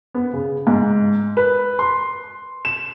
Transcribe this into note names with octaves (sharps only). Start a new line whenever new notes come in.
B3
C#3
G#2
B4
C6
E7